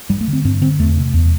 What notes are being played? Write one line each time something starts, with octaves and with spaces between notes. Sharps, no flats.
G2 G3
A3
D3
C4
G2 C4
D3 C4
E2 A3
C3
E2